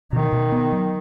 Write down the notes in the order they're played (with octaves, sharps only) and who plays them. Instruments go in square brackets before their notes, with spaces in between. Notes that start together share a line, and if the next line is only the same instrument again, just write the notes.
[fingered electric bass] B2 [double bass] D#3
[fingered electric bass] B2
B3
F#3